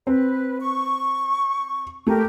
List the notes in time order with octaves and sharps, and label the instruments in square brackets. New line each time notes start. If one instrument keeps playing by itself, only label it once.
[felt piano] C4 [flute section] B4
[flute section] C#6
[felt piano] A3 [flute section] G4 A#4